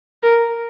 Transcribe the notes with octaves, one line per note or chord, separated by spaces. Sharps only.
A#4